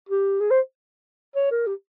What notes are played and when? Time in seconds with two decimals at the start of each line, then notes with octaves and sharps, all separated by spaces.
0.09 G4
0.41 G#4
0.51 C5
1.35 C#5
1.51 A#4
1.67 G4